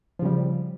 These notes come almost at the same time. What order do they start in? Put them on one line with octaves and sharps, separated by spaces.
F3 C#3 G3